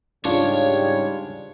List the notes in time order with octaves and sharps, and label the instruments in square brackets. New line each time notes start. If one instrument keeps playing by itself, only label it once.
[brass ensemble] G#2 C#3 G3 [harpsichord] D4 [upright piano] F4 [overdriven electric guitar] C#5